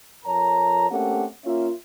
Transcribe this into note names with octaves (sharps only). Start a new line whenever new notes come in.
F2 A#4 C#5 A5 A#5
A3 A#3 C4 C#4 G4 F#5
A#3 C#4 F4 E5